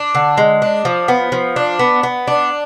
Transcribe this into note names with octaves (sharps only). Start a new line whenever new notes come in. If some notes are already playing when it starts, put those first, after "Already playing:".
Already playing: D4
D3
G#3
D4
F3
B3
F3
D4
B3
B3
D4